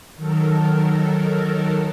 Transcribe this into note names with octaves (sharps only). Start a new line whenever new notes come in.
D#3 F#3 A4 A#4